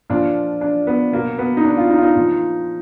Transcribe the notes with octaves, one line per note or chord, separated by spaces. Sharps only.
A#2 F3 D4
D4
B3
B2 F#3 A#3
B3
D#4
D4
F4
D#4
F4
D#4
A#2 F3